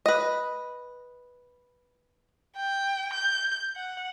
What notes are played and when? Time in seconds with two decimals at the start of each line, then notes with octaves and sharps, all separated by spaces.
0.06 B4 D#5
2.56 G5
3.14 G6
3.77 F#5